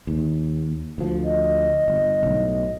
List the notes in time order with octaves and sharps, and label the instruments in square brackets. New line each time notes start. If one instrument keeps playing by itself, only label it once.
[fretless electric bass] D#2
D2 F3
[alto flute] D#5
[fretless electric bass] G1
B1 A2